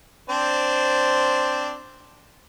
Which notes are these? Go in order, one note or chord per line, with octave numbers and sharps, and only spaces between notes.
C4 D4 C5